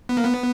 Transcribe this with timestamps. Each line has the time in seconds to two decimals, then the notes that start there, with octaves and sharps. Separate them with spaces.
0.09 B3
0.17 A#3
0.25 B3